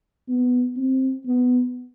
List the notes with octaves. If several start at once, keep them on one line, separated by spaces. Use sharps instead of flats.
B3
C4
B3